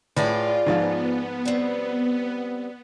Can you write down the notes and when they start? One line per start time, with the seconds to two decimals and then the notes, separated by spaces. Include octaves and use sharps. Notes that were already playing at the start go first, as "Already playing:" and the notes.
0.16 A2 F4 G#4 B4 D5
0.66 G#2 F3 B3 F5
1.45 G3 C4